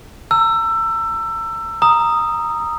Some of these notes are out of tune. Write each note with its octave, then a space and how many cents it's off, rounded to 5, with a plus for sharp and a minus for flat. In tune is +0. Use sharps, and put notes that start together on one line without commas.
A#5 -35 E6 +20
A#5 +0 D#6 +0